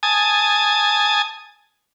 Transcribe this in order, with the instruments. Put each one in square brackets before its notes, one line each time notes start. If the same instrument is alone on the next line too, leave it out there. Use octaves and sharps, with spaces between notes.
[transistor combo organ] G#5 A5 D#6